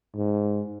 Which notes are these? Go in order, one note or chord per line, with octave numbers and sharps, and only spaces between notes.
G#2